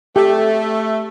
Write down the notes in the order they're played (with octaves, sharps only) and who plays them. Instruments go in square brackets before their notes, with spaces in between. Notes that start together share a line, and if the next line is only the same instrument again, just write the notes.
[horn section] A3 [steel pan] G4